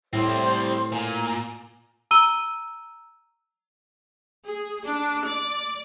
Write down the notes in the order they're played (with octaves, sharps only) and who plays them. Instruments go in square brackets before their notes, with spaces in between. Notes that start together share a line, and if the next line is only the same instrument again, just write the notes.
[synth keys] A2 [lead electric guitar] G3 C4 [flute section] C5
[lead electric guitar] A#2 [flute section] G#5
[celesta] A#5 E6 D#7 G7
[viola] G#4
D4
D5